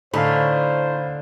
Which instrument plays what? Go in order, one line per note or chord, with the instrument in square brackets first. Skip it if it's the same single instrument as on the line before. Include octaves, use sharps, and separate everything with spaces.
[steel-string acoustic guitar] A2 C#4 D#4 [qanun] D3 [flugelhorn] C5 [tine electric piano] F5 B5